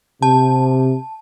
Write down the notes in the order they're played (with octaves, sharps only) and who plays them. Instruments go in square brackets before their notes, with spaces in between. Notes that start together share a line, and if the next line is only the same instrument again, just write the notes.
[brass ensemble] C3 [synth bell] A5